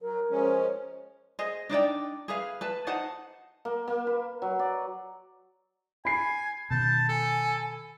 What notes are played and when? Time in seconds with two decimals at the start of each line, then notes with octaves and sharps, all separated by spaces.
0.02 F#3 A#4
0.31 F3 G#3 C#4
1.39 G#4 C5 D#5
1.70 D4 D#4 D5 G5
2.28 G#4 B4 F5
2.61 B4 A5
2.87 D#4 C5 F#5 A5
3.65 A#3
3.88 A#3
4.07 B4
4.42 F#3
4.59 D5
6.05 G#5 B5 C7
6.71 B2 D#3 A5 G6
7.09 A4 G#5